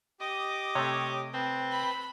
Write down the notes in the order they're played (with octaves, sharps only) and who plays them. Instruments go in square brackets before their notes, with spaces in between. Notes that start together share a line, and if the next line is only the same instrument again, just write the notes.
[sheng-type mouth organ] G4 D6 D#6 [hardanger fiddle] D#5
[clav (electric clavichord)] C3 A3 [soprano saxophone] C#5
[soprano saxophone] C4 [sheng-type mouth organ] B4 A5
[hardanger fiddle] B5